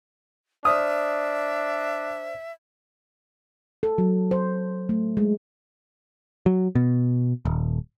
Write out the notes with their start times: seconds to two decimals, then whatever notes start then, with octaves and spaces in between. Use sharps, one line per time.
0.65 D4 C5 D5 E5 D#6 F6
3.83 A4
3.98 F#3
4.31 C5
4.89 A3
5.17 G#3
6.46 F#3
6.75 B2
7.45 D#1